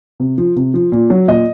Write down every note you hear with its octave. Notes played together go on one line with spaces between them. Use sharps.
C3
F3
C3
F3
A#2
F#3
A#2 D#5